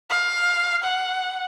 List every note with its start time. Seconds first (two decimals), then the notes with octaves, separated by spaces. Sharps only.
0.10 F5
0.84 F#5